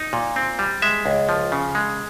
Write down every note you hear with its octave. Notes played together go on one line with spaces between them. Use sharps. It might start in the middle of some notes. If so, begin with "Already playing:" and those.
Already playing: D#4
A#2
C4
G3
G#3 E5
C#2
F3
C#3
G#3